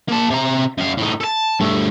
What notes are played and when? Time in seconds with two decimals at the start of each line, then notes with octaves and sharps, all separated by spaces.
0.09 A#3 A5
0.30 C3 A#5
0.78 F#2 F5
0.98 A2 D#4
1.21 A4 A5
1.60 G2 A3